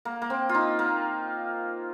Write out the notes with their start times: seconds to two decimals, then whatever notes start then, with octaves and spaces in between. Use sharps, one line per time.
0.05 A#3
0.22 A#3
0.30 C4
0.49 F4
0.55 D#4
0.79 A#3